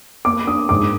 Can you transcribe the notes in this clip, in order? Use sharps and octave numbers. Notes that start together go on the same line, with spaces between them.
A#3 D6
D4 D#6
G#2 D6